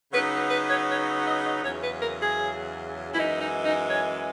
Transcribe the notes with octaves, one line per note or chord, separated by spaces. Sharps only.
C#3 F#3 B3 D#4 B4
B4
C#5
C#5
D#5
D#5
E2 C#3 F#3 C#4 C#5
B4
A#4
G#4
F#2 E3 G#3 D#4 E4
D#4
D#4
C#5